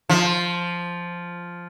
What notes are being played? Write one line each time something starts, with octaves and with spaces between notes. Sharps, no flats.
F3